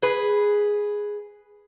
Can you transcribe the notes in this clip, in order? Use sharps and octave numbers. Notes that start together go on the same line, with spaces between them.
G#4 B4